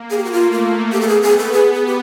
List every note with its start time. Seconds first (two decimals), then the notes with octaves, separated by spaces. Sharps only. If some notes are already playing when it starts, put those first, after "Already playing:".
Already playing: A#3
0.10 G#4
0.17 G4
0.24 F#4
0.32 A3 F4
0.52 F4
0.92 B3 G4
1.01 A4
1.08 G#4
1.22 G#4
1.38 A4
1.52 G#4
1.73 G#4
1.86 G4